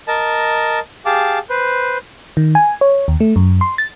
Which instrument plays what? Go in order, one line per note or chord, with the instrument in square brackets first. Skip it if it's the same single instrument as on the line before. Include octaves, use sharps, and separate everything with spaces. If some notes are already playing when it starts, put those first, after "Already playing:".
[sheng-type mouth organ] A#4 D#5 A5
G4 G#4 F5 A5 D6
B4 C5
[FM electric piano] D#3
G#5
C#5
D#2
A3
F#2
C6
A6